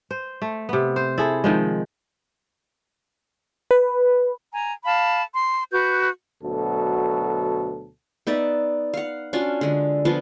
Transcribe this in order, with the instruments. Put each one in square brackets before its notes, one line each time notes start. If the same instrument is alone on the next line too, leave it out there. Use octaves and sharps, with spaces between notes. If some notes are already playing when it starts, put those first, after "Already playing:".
[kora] C5
A3
C3 B3
C5
E4 G#4 A4
D#3 F3 G#3
[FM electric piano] B4
[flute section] G#5 A#5
F5 A5 B5
C6
F#4 B4 G6
[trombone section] D2 B2 F#3 A4
[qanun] B3 D#4 D5 E5
F5 F#5
C#4 D4 F4 F#4
D3 G#3
F3 B3 D4 F4